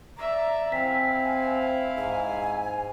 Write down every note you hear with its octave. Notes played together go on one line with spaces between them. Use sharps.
D5 E5 A#5
C4 E4 F5 G#5 B6
G#2 G#5